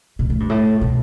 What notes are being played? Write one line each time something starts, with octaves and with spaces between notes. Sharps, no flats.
B2
A2
G2
A2
B2